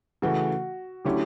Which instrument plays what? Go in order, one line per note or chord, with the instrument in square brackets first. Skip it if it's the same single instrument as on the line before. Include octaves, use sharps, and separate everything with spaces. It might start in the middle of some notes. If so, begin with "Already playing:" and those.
[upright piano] C#3 E3 A3 [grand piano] F#4
[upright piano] D3 F#3 A3 C#4 [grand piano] E4 G4